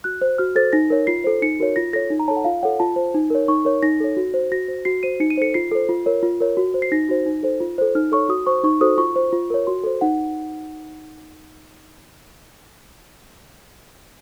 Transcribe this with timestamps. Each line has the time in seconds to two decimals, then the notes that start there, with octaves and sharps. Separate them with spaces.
0.04 F#4 F#6
0.21 C5
0.38 F#4 F6
0.56 A4 C5 A6
0.73 D#4 A#6
0.90 A#4 C#5
1.07 F4 C7
1.24 A4 C5
1.42 D#4 C#7
1.60 F#4 A#4 C#5
1.76 F4 A#6
1.93 A4 C#5 A#6
2.10 D#4
2.20 A#5
2.28 A4 C#5 A5
2.36 F#5
2.44 F4 F5
2.63 A4 C#5 F#5
2.80 F4 A5
2.96 C5
3.14 D#4
3.30 A#4 C#5
3.48 D#4 C#6
3.65 A#4 C#5
3.83 D#4 A#6
4.00 A4 C#5
4.17 F#4
4.34 C5
4.52 F#4 A#6
4.68 C5
4.85 F#4 C7
5.03 C5 D#7
5.20 D#4 C#7
5.30 D#7
5.38 A4 C5 C#7
5.54 F4 C7
5.72 A4 C5
5.89 F4
6.06 A#4 C#5
6.23 F4
6.41 A#4 C#5
6.57 F#4
6.74 C5
6.82 C7
6.92 D#4 A#6
7.09 F#4 C5
7.26 D#4
7.43 A4 C5
7.60 F4
7.78 A4 C5
7.95 D#4 F6
8.12 A4 C#5 C#6
8.29 F#4 D#6
8.46 C5 C#6
8.64 D#4 C#6
8.81 F#4 A4 C5 D#6
8.98 F4 C#6
9.16 C5
9.33 F4
9.50 A#4 C#5
9.67 F#4 C6
9.84 A4 C5
10.01 D#4 F#5